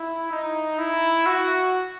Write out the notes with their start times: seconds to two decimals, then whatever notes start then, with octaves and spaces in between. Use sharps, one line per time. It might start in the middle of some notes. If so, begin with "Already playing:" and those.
Already playing: E4
0.31 D#4
0.78 E4
1.26 F#4